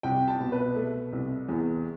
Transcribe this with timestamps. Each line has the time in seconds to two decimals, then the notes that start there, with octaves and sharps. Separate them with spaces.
0.03 C2 G5
0.28 A5
0.40 B2
0.52 B4
0.76 A3
1.13 C2
1.49 E2